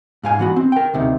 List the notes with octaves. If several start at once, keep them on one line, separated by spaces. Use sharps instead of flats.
G#2 F5 G#5
E3 B3 F#4
C4
A#4 G5
D2 C3 D#3